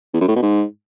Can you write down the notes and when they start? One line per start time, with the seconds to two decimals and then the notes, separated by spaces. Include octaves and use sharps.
0.14 E2
0.21 F#2
0.28 A2
0.35 B2
0.43 G#2